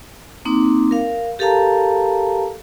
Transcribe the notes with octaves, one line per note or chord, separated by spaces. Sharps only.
A#3 C4 D#4 D6
A#4 F5
G4 A4 A#4 F5 A5 A#5